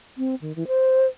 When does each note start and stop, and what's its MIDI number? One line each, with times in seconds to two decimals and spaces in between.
0.18 0.35 60
0.42 0.55 51
0.56 0.67 52
0.67 1.07 72